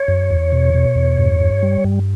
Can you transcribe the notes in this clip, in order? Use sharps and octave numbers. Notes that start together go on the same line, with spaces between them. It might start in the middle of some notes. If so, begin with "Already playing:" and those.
Already playing: C#5
F#2
E2
B2
B2
E2
G2
G2
G3
G2